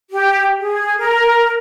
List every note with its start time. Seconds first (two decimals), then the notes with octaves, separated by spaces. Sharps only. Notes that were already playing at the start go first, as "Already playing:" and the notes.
0.11 G4
0.60 G#4
0.99 A#4